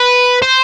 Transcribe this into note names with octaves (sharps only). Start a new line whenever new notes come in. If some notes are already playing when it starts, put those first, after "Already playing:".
Already playing: B4
C5